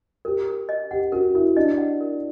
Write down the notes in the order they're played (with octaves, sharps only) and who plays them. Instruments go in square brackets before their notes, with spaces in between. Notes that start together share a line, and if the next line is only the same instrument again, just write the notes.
[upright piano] G4 [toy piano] A#4
[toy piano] A#4
D#5
[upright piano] G4 [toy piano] F#5
[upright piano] F#4 [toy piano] A#4
[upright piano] E4 [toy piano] A#4
[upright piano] D4 [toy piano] D#5
[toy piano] F#5
A#4